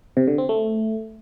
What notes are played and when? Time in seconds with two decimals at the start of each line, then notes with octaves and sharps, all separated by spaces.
0.17 C3
0.27 D3
0.38 C4
0.49 A3